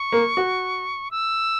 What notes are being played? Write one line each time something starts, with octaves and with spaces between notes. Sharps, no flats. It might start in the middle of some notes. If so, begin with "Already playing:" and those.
Already playing: C#6
A#3
F#4
E6